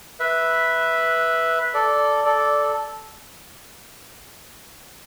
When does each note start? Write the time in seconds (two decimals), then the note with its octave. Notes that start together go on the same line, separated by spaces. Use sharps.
0.20 B4 E5
1.74 A4 D5
2.26 A4 D5